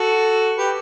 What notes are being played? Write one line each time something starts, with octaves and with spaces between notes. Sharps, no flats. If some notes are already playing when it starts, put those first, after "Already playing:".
Already playing: F#4 A4
G4 B4